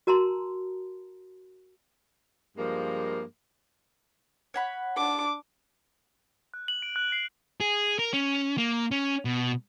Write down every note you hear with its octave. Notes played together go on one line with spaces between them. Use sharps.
F#4 A#4 A5 A#5 C6
G2 F3 G#3 A#3
C#5 F#5 B5
D4 D6
F#6
F#7
D7
F#6
C7
G#4
A#4
C#4
A#3
C#4
B2